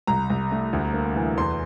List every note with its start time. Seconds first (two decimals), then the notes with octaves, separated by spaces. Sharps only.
0.07 C2 A#5
0.30 C2
0.51 A3
0.73 D2
0.94 A#3
1.16 E3
1.38 E2 C6